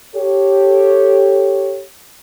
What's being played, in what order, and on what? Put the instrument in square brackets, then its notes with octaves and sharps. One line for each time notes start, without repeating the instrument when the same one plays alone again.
[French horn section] G4 A4 C#5